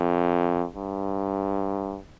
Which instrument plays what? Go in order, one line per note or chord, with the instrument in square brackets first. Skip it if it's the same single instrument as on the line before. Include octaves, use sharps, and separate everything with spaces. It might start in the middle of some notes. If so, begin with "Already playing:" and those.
Already playing: [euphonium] F2
G2